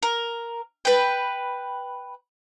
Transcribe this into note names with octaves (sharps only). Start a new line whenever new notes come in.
A#4
B4 G5